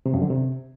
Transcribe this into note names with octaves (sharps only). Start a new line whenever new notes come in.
C3
F#2
D3
C3